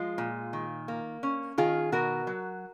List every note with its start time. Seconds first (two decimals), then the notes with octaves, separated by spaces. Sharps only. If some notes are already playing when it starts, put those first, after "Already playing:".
Already playing: F3 G#3 F4
0.18 A#2
0.53 D#3
0.88 A#3
1.23 C#4
1.58 D#3 F4 G#4
1.92 B2 F#4 A#4
2.27 F#3